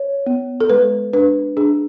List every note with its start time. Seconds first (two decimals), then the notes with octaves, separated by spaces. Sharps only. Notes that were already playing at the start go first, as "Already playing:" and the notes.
Already playing: C#5
0.27 B3
0.61 A4
0.70 G#3 B4
1.13 D4 B4
1.57 D4 G#4